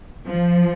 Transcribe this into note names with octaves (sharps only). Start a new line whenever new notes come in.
F3